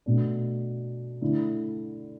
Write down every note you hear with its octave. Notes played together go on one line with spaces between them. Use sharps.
B2 A3 D4
D3 A3 E4